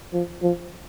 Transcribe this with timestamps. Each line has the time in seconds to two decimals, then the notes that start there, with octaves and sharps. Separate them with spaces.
0.13 F3
0.42 F3